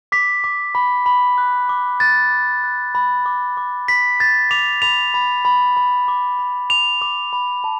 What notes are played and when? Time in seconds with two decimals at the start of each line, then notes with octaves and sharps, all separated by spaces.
0.12 D6 B6
0.44 D6
0.75 B5
1.06 B5
1.38 F#6
1.69 D6
2.00 F#6 A6
2.31 D6
2.64 F#6
2.95 B5
3.26 D6
3.57 D6
3.88 B5 B6
4.20 B5 A6
4.51 D6 F7
4.82 B5 F7
5.14 B5
5.45 B5
5.77 B5
6.08 D6
6.39 B5
6.70 D6 F7
7.01 D6
7.33 B5
7.64 A5